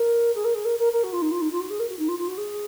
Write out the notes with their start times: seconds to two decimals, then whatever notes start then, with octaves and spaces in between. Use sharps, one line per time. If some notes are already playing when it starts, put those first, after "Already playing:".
Already playing: A#4
0.35 G#4
0.44 A#4
0.54 G#4
0.64 A#4
0.79 A#4
0.92 A#4
1.03 F#4
1.12 F4
1.21 D#4
1.31 F4
1.41 D#4
1.51 F4
1.60 F#4
1.70 G#4
1.79 A#4
1.89 F#4
1.98 D#4
2.08 F4
2.18 F4
2.27 F#4
2.37 G#4